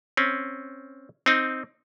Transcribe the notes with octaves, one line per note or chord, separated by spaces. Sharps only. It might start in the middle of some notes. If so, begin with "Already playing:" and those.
C4 C#4
C4 D#4